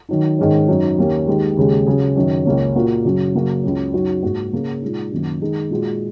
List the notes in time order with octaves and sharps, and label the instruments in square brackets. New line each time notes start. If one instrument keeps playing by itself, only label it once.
[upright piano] D#3 F#3 D#4
G#2 D#3 G#3 C#4
F#2 F#3 D#4
D#2 D#3 A#3 C#4
D#2 D#3 G#3
D#2 C#3 G#3
C#3 F#3 C#4 G#4
F#2 D#3 F#3
C#2 C#3 A#3 C#4
A#2 A#3 F#4
F#2 C#3 F#3
F#2 C#3 A#3 F#4
C#2 C#3 F#3 C#4
F#2 F#3 D#4 F#4
G#2 F#3 A#3 F#4
C#3 A#3 C#4 G#4
A#2 G#3 D#4
F#2 D#3 A#3
D#3 G#3 D#4 G#4
A#2 G#3 F#4